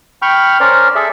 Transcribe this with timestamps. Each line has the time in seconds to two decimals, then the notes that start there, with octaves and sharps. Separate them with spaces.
0.22 G5 B5 C#6 F6
0.60 C#4 A#4 C5 D5
0.95 G#4 A4 D5 E5